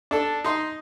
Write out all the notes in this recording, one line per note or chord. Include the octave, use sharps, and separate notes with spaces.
D4 A4
D#4 D#5 C6